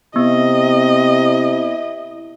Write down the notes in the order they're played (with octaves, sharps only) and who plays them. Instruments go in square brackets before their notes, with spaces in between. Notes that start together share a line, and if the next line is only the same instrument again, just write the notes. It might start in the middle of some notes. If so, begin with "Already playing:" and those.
[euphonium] C3 [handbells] B3 [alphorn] E4 [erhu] D#5